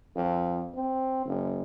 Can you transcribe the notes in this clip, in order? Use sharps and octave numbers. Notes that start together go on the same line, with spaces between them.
F2
C4
F#1